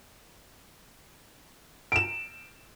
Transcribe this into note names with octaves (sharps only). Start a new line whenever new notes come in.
D7 E7